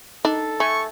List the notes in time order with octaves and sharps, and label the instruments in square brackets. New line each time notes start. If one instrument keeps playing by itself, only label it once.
[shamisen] D4 [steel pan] D#4 [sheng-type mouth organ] A4
[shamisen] A3 [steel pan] G#5 [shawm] C#6